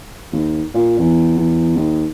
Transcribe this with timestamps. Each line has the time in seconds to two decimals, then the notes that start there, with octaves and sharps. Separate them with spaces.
0.32 D#2
0.74 A#2
0.99 E2
1.38 E2
1.76 D#2